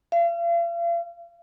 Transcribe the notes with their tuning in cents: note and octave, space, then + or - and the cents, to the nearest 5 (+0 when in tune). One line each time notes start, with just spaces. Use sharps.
F5 -40